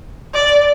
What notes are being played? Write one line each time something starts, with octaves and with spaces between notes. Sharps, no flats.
D5